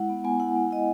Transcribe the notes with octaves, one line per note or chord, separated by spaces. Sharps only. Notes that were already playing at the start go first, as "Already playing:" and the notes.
Already playing: G#3 E4 F#5
B3
B3 G#5
E4 F#5
B3
E4 D#5